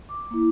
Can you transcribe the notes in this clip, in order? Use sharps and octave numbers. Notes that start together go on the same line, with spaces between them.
D6
A#3 E4